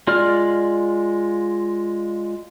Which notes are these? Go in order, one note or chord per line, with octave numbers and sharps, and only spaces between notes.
G#3 F4 D5 F6